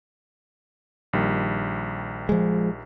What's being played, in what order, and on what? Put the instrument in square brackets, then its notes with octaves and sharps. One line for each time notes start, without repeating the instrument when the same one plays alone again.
[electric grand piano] A#1 D#3 G3
[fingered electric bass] F3 G#3